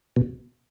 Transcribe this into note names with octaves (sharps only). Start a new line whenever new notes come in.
B2